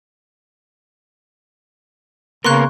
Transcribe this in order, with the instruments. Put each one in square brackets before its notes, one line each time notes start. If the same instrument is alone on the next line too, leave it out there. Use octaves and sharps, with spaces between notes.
[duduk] C#3 [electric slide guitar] A#3 B3 A#4 [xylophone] C6 C#6 F#6